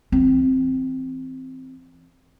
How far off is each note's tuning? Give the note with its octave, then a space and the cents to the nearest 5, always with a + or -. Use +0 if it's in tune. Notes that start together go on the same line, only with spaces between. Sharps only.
E3 +0 C4 +0